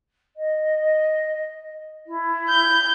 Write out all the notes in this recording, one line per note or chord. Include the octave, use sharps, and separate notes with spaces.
D#5
E4
G6